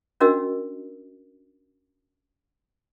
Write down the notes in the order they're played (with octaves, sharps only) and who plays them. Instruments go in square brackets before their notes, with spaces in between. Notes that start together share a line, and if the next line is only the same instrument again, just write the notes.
[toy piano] C#4 D4 F#4 A#4 D#5 E6